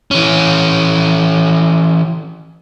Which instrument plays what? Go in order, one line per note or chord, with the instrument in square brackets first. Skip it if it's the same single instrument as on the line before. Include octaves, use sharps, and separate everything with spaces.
[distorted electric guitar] E3 C#4